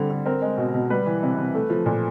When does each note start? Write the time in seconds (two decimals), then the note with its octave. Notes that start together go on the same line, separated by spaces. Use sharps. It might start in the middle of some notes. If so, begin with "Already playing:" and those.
Already playing: D3 G3 C4
0.10 D3
0.26 C4 A#4
0.42 G#3
0.58 B2
0.74 B2
0.90 G3 B4
1.06 E3
1.23 C3
1.38 C3
1.55 A3
1.70 F3
1.86 A#2